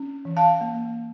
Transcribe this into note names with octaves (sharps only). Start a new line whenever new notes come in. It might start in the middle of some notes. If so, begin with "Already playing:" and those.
Already playing: C#4
E3
F5 A5
A#3